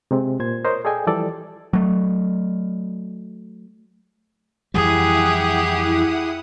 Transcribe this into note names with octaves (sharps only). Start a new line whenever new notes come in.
C3 G#3 C4
A#2 C5 G#6
A#4 C5 C#5 D#5
G#4 A4 D5 D#5 G5 G#5
E3 F3 G3 A4 D5
F#3 A3
F2 E3 G3 E4 G4 G#4 F#5 D#6